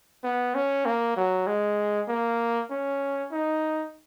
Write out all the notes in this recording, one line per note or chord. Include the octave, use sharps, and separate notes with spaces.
B3
C#4
A#3
F#3
G#3
A#3
C#4
D#4